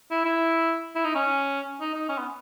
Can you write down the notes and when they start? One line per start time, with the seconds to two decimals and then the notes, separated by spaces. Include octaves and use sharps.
0.11 E4
0.25 E4
0.96 E4
1.05 D#4
1.15 C#4
1.81 D#4
1.95 D#4
2.09 C#4
2.18 B3